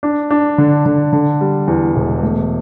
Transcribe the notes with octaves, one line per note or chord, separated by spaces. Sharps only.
D4
D4
D3
D3
D3
G3
E2
E1
A3